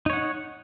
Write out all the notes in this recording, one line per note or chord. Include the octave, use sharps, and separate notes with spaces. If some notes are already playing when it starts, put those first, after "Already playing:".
D#4 C#5 F#5